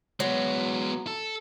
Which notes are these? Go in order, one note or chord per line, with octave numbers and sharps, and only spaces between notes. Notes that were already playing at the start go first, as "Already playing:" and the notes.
F#3 G#3 B3
A4